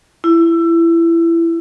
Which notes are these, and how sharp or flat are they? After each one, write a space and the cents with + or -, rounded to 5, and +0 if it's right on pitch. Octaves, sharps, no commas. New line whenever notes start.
E4 +20